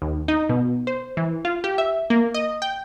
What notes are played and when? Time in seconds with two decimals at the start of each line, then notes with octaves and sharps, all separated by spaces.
0.02 D#2
0.28 D#4
0.49 B2
0.87 C5
1.17 E3
1.45 F4
1.64 G4
1.78 E5
2.10 A#3
2.34 D#5
2.62 G5